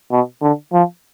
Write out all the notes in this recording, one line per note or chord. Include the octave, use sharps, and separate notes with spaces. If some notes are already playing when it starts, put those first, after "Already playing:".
B2
D3
F3